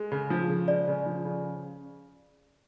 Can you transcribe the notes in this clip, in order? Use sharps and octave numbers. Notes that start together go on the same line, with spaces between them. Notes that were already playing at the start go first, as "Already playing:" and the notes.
Already playing: G#3
C#3
F3
C#3
G#3 D5
C#3
F3
C#3